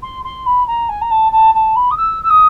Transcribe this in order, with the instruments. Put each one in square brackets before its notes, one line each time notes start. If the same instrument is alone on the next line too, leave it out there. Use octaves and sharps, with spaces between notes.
[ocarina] C6
C6
B5
A#5
G#5
A#5
A5
A5
A5
B5
D#6
E6
E6
D#6